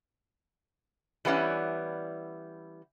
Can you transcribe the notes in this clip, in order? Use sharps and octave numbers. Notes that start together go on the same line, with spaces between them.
E3 G3 B3 C#4 E4